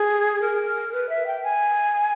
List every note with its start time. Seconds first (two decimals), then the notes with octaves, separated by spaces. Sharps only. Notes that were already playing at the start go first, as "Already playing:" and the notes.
Already playing: G#4
0.41 A#4
0.92 B4
1.09 E5
1.27 G5
1.44 G#5